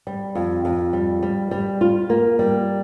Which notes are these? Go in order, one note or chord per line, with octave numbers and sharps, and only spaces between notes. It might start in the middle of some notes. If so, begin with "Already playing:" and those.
G3
F2
F2
G3
G3
G3
F4
A#3
G3